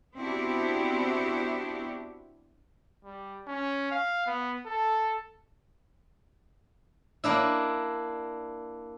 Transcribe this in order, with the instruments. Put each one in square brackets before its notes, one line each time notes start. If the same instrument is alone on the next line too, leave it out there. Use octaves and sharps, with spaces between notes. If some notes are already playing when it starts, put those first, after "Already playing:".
[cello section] B3 C4 D4 E4 F#4 G4
[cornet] G3
C#4
F5
B3
A4
[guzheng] A#3 D4 E4